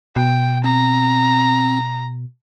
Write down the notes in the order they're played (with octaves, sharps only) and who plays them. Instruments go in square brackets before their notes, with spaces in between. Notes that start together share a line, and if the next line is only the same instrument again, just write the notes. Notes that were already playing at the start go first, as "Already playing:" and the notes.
[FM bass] B2 [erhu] G5
[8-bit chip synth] C4 [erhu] A#5